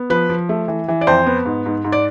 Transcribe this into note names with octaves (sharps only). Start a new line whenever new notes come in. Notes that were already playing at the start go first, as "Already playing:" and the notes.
Already playing: B3
F3 B4
F3
A3
E3
E3
D5
F2 C5
B3
G#2
G#2
G#2
D5